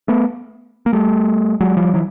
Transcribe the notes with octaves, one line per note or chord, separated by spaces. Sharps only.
A3 B3
A#3
G3 A3
F#3 G#3
F3 G3
E3 F#3